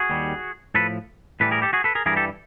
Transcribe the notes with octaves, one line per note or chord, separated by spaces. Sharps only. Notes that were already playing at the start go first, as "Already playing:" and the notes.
Already playing: F#4 G#4
D#2 D#3 G3
A2 F3 A4 B4
A2 E3 G3 A4 B4
G#4 A#4
G4 A4
F#4 G#4
A4 B4
G#4 A#4
G2 E3 G3 G#4 A#4
G4 A4